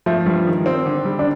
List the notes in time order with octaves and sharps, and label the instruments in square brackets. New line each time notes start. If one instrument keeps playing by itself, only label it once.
[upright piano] F3 [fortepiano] A3
[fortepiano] G2
D#3
C4
D3
G3
[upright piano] D4